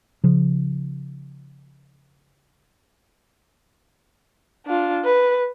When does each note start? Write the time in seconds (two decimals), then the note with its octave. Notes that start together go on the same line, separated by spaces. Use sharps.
0.24 C#3 F3
4.66 D4 F4
5.05 B4